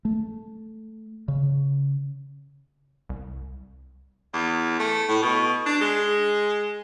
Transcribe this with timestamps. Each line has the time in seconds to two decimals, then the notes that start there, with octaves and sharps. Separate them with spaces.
0.05 A3
1.28 C#3
3.09 C2
4.34 E2
4.80 A3
5.09 A2
5.22 B2
5.66 D4
5.81 G#3